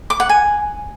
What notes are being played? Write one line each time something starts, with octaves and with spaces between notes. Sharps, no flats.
D6
F#5
G#5